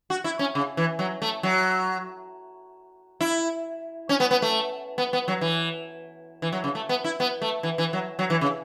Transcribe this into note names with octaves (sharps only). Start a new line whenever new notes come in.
F#4
E4
C#4
C#3
E3
F#3
A3
F#3
E4
C#4
B3
B3
A3
B3
B3
F#3
E3
E3
F#3
C#3
A3
B3
E4
B3
A3
E3
E3
F#3
F#3
E3
C#3